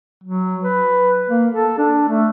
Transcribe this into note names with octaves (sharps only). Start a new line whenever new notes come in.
F#3
B4
A#3
A4
D4
A3